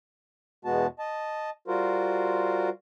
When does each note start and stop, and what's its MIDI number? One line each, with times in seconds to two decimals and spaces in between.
0.65 0.87 40
0.65 0.87 47
0.65 0.87 56
0.65 0.87 59
0.65 0.87 66
0.65 0.87 81
0.99 1.50 75
0.99 1.50 81
1.68 2.69 55
1.68 2.69 65
1.68 2.69 66
1.68 2.69 70
1.68 2.69 72